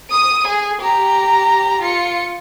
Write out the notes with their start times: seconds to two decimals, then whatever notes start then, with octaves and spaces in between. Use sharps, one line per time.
0.11 D#6 D#7
0.48 G#4
0.81 G4 A#5
1.82 F4 C#7